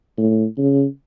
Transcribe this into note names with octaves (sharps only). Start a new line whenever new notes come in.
A2
C#3